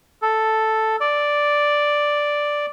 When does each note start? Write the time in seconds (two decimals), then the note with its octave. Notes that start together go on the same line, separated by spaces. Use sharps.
0.22 A4
1.01 D5